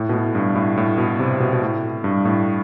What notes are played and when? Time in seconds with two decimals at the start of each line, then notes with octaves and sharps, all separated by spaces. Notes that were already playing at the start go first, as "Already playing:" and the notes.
Already playing: A2
0.09 B2
0.13 A2
0.35 G2
0.55 A2
0.77 A2
0.98 B2
1.19 C3
1.40 B2
1.53 B2
1.62 A2
2.04 G2
2.25 A2